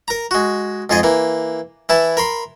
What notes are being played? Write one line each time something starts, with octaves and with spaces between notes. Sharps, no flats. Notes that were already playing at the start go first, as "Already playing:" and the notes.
A#4 A#5
G#3 F#4
F2 G#2 F4 G#4 D#5
E3 A#3
E3 E4 A5
A#4 B5 C6